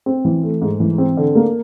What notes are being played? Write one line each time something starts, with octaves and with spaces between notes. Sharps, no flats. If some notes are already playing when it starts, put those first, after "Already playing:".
C4
E3
A3
G#2
E3
C4
D3
A#3